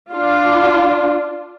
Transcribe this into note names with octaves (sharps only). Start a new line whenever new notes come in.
D4 F4